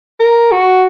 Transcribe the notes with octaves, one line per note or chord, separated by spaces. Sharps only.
A#4
F#4